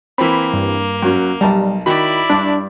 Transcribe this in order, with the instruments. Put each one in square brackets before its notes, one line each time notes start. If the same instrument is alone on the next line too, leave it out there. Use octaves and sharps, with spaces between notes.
[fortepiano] E3 C4 [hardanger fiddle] A#3 [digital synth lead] B5
[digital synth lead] G2
[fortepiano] F#2 F#3 C#4
[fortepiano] B1 A5 A#5 [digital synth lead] G3
[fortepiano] D#3 F#4 [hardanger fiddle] E4 D5 [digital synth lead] B5
[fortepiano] G2 D6 [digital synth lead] D4